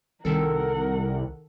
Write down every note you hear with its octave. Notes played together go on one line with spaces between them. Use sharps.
C2 D#3 A4 A#4 F#5